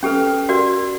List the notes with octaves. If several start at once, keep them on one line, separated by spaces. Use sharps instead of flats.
C#4 G4 A4 B4
F#4 A#4 D5 C6